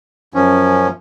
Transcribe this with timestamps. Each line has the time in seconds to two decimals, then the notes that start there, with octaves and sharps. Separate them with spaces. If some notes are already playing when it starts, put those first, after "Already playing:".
0.34 F#2 F3 C#4